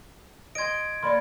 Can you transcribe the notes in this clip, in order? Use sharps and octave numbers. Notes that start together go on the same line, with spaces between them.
D#5 C6 G#6 D7
A#3 C#5 D5 B5 C6